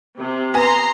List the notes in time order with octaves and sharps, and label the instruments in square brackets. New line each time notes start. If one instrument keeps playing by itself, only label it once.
[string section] C3
[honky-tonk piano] B3 G#5 [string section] A#5 C6